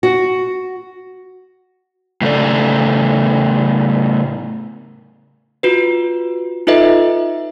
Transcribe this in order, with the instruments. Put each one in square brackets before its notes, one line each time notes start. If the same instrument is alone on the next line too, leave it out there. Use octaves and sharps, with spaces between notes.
[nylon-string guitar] F#4
[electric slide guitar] A2 C#3 A4 D5
[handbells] F4 F#4 B4
D#4 F4 A4 B4 D#5 E5